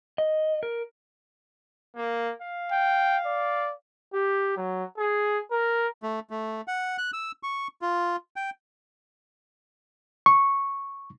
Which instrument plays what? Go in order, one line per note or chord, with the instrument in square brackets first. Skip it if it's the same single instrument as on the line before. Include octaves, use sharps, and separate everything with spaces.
[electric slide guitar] D#5
A#4
[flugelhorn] A#3
F5
[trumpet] G5
D5
[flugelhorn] G4
F#3
G#4
A#4
[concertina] A3
A3
F#5
F#6
E6
C#6
F4
G5
[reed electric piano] C#6